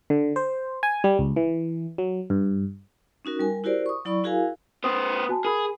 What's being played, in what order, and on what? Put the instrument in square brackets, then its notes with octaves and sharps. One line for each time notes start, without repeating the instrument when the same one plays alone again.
[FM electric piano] D3
C5
G#5
G3
C#2
E3
F#3
G2
[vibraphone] C#4 D#4 F#4 A#4
G3 A#4 G#5
E4 F#4 G4 A#4 C5 D5
C#6 D#6
F#3 E4 D5 B5 C#6
E4 F#4 G#4 A#4 F5 G#5
[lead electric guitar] B3 C5 [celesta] D#6
[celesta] F#4 G#5 A5
[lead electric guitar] G#4 [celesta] A#4 B5